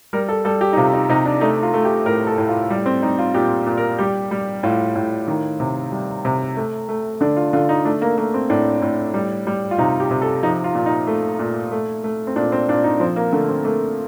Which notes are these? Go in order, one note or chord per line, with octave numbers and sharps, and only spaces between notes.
G3 A#4
A4
G3 A4
G4
D#4
C3 F4
D#4
C3 D#4
D4
A3 D#4
F4
A3
G4
A2 A#4
A4
A2
F4
G3
C4
G3 D#4
F4
A#2 G4
A#2
A#4
G3 G4
G3
A2 F4
A2
D#3
C3
G3
C3
A3
A3
D3 D4
F4
D3 F4
D#4
A3 D4
A#3
A3 A#3
C4
A2 D4
A2
G3
G3
F4
C3 D#4
G4
C3
A4
F3 D#4
F4
A#2
D#4
A3
A#2
A3
A3
C4
A#2 D4
C4
A#2 D4
D#4
F3 C4
A#3
D3 A3
C4
A3 A#3